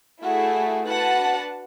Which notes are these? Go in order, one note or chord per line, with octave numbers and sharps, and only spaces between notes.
A3 E4 F#4 G#4
E4 F#4 B4 F#5 A5
D4